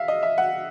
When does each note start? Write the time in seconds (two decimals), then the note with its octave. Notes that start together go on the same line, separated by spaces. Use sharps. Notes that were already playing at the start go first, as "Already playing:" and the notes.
Already playing: E5 F5
0.08 D#5
0.23 E5
0.38 F#5